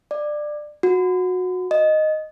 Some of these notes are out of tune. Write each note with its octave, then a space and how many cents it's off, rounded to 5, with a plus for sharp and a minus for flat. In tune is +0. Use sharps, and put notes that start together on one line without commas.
D5 +20
F#4 -20
D#5 -5